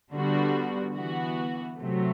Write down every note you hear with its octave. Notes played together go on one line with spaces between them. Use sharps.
D3 G3 B3 F#4
E3 B3 F#4
C3 F#3 A3